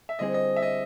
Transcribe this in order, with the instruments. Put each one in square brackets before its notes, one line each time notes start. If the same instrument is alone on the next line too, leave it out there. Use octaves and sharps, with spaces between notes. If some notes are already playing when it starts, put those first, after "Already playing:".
[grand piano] E5
[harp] D3 G3 C4 E4 G#4 [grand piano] D#5
[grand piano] D#5
E5
D#5